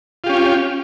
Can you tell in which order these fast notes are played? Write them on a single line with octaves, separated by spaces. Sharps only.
F4 G4 C#4